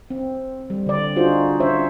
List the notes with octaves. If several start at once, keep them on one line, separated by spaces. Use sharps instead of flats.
C4
G3
D3 D5
D4 D#4 F4 F#4 G#4 C5
C#4 C5 C#5 E5